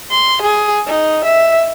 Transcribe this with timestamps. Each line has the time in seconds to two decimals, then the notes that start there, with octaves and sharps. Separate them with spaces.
0.10 C6
0.42 G#4
0.87 D#4
1.25 E5